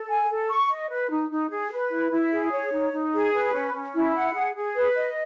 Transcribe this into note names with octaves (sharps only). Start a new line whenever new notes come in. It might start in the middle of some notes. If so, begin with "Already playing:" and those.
Already playing: A4
G#5
A4
C#6
D#5
B4
D#4
D#4
G#4
B4
E4
E4
G#4
C#5
D#4
D#4
G#4
B4
C#4
C#4
E4
F#5
G#4
G#4
B4
D#5